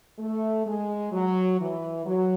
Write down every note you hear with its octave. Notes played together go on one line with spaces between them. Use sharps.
A3
G#3
F#3
E3
F#3